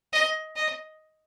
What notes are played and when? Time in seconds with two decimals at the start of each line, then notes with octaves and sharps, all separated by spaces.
0.13 D#5
0.56 D#5